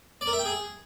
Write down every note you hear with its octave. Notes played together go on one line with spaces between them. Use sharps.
D5
A#4
E5
G5
G#4